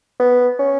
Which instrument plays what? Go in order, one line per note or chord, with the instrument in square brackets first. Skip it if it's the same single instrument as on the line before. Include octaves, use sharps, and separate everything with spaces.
[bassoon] B3
C#4